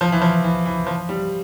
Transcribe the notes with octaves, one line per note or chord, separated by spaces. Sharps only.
F3
E3
F3
E3
E3
F3
G3